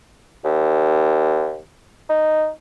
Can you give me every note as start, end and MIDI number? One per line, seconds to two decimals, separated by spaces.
0.45 1.58 39
2.09 2.49 63